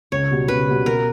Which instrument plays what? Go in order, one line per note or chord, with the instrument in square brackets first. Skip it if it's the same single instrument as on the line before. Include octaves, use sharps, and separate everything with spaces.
[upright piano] C#2 [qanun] C#5
[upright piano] B2 G3
[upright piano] C#2 [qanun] B4
[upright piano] B2 G3
[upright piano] B2 [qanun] A#4